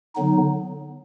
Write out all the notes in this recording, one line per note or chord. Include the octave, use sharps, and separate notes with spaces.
D3 F#3 B3 D#4